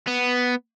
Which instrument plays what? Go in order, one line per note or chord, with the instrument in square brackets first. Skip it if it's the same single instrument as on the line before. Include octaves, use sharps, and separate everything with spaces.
[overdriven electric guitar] B3